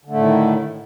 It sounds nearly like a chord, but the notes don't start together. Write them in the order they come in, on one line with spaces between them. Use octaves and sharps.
D3 A3 A2 D#3